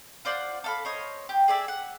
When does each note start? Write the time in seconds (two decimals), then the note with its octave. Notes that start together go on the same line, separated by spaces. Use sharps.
0.25 F4 C5 D5 F#5
0.64 A4 F5 B5
0.85 C5 C#5 D#5
1.29 G4
1.48 G#4 D5 E5
1.68 F#5